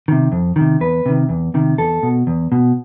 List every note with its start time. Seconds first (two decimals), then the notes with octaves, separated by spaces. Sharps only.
0.08 C3 D#3
0.32 F2
0.56 C3 D#3
0.80 E2 B4
1.06 C3 D#3
1.29 E2
1.54 C3 D#3
1.78 E2 A4
2.03 B2
2.27 E2
2.52 B2